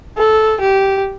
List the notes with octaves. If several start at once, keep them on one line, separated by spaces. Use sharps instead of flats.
A4
G4